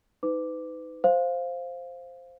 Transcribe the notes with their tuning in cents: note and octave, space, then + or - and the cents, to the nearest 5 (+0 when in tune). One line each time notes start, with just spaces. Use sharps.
D#4 +20 B4 +35 D6 +0
C5 +0 F5 +0